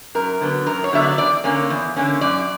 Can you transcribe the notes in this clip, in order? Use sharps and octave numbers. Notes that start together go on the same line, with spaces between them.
F#2 A#4
D3 F#3 B3
F#2 A#4
C#5
D3 F#3 B3 E5
D5
E2 D5
D3 A#3 C#4
E2
D3 A#3 C#4
F#2 D5